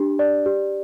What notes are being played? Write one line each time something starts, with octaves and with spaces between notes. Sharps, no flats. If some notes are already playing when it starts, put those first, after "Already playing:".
Already playing: D4 G4
D5
G4